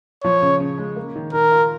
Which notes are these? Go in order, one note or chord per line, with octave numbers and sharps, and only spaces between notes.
F3 C#5
C#3
C#3
G#3
A#3
D#3
D#3 A#4
F4